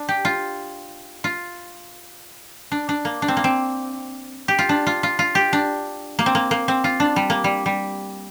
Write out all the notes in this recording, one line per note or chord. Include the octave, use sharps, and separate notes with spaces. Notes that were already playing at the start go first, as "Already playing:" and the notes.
Already playing: D4
G4
F4
F4
D4
D4
A#3
D4
C4
A#3
C4
G4
F4
D4
F4
F4
F4
G4
D4
A#3
C4
A#3
A#3
C4
F4
D4
G3
A#3
G3
G3